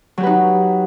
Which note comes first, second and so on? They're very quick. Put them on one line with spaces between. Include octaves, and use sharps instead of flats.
F#3 G4 B4 D#4